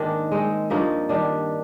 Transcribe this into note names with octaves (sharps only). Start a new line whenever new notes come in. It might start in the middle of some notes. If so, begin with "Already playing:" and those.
Already playing: G#2 D#3 G#3 A#3 D4
G#3 C4 D#4
G2 F3 A#3 D#4
D#3 G3 D4